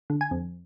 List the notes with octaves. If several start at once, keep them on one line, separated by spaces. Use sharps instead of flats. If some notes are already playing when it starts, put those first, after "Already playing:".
D3
G#5
F2